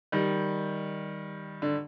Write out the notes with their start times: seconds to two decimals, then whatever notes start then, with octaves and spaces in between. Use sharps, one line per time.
0.12 D#3 G3
1.62 D3